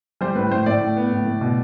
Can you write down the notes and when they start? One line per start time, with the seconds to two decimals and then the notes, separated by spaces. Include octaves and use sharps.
0.21 G3 C5
0.35 A2 B4
0.51 A2 C5
0.66 A2 D5
0.81 A2
0.97 B3
1.12 A2
1.26 A2
1.41 B2